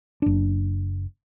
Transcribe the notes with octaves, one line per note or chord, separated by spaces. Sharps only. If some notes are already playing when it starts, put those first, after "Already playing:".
F#1 D4